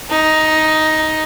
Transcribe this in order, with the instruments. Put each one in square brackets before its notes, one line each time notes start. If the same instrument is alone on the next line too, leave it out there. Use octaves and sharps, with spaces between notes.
[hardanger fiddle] D#4